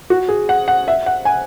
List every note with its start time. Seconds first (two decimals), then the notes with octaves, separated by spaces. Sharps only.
0.10 F#4
0.29 G#4
0.49 F#5
0.68 F#5
0.88 E5
1.06 F#5
1.25 G#5